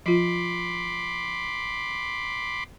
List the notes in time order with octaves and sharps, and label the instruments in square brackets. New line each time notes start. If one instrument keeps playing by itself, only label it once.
[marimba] F3 F4 [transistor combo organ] B5 C6 D6